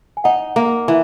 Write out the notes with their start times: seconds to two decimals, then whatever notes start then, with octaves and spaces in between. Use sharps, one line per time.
0.17 G#5
0.24 D#4 D#5 F#5
0.56 A#3
0.88 E3